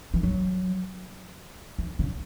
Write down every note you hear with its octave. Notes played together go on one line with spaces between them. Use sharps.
E3
F#3
E3
C#3